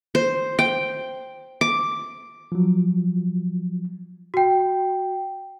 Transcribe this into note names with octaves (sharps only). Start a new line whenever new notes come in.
C5
G5
D6
F3 F#3
F#4 G5